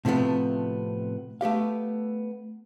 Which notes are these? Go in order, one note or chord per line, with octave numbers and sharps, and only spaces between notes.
A2 C3 F3 A3 B3
A3 B3 G4 F5